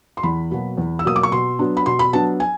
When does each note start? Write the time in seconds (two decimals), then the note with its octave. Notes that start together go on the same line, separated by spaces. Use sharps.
0.17 C6
0.23 E2 B5
0.51 B2 F#3 A#3
0.78 E2
0.99 E6
1.05 B2 F#3 A#3 D#6
1.16 D6
1.23 C#6
1.32 B2 C6
1.59 F#3 B3 D4
1.77 B5
1.86 B2 C6
1.99 B5
2.13 F#3 B3 D4 A5
2.40 G#5